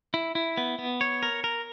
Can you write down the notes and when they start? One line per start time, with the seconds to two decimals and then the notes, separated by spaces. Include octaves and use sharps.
0.14 E4
0.35 E4
0.57 B3
0.79 B3
1.01 C#5
1.23 A#4
1.44 A#4